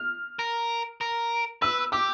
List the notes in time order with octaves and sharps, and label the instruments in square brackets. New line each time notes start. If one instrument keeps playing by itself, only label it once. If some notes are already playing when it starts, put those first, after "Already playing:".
Already playing: [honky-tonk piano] F6
[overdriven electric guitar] A#4
A#4
[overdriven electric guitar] B4 [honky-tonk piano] E6
[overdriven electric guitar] G4 [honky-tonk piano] D6